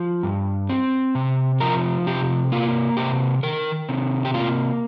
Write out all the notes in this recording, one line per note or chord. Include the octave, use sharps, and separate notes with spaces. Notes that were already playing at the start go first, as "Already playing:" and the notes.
Already playing: F3
G2
C4
C3
F3 A#4
C3 G4
A#3 F4
C3 G4
D#3 A#4
C3
G4
A#3 F4